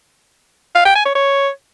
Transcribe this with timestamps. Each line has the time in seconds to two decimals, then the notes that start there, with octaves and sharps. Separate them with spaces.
0.75 F5
0.85 G5
0.95 G#5
1.05 C#5
1.15 C#5